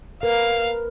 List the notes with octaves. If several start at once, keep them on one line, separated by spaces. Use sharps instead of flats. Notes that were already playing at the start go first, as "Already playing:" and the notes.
A#4 B4 F5